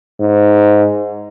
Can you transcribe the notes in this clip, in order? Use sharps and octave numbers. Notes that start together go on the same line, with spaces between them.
G#2